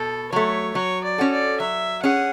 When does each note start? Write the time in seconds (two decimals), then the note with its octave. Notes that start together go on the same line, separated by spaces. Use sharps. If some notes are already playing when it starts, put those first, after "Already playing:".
Already playing: B2 A4
0.32 F#3 A3 C#5
0.75 F#3 C#5
1.04 D5
1.18 C#4 F#4 A4
1.32 D5
1.60 F#3 E5
2.02 C#4 G#4 F#5